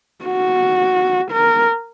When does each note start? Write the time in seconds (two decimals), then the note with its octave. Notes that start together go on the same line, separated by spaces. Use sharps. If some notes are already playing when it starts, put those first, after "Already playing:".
0.25 F#4
1.32 A#4